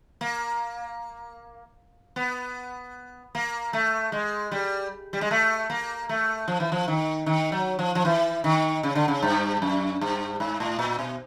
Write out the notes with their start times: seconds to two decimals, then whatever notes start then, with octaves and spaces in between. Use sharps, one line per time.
0.21 A#3
2.16 B3
3.35 A#3
3.73 A3
4.12 G#3
4.52 G3
5.13 G3
5.21 G#3
5.31 A3
5.70 A#3
6.09 A3
6.48 F3
6.60 E3
6.72 F3
6.88 D#3
7.26 D#3
7.52 F#3
7.79 F3
7.95 F3
8.05 E3
8.44 D#3
8.83 C#3
8.95 D3
9.08 C#3
9.22 G2
9.62 F#2
10.01 G2
10.40 G#2
10.60 A2
10.79 A#2
10.99 B2